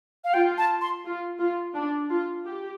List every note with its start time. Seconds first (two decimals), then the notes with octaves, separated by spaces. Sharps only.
0.24 F5
0.34 F4 G5
0.58 A5
0.81 C6
1.05 F4
1.39 F4
1.74 D4
2.10 F4
2.45 G4